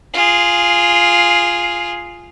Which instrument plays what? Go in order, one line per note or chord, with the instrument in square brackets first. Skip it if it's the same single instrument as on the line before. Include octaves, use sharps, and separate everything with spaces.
[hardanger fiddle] F4 G#4